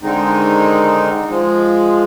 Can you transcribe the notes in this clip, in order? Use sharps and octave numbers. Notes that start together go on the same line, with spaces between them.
D3 D#3 G#3 C4 D#4
F3 G#3